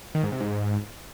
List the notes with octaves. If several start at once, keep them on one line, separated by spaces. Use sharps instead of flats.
D#3
G#2
C3
G#2